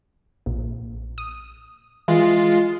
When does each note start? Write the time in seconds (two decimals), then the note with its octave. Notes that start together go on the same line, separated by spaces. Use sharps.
0.46 A#1
1.18 D#6
2.08 E3 G#3 F4